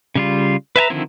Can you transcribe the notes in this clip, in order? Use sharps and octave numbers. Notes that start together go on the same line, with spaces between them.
C#3 G3 F4
B4 E5 G#5 A#5
D3 D#3 F3 C4 E4